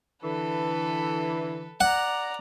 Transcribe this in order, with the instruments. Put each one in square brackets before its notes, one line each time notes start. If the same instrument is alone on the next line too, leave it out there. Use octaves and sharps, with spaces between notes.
[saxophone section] D3 E3 [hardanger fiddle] A4 B4
[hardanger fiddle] D5 A#5 [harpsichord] F#5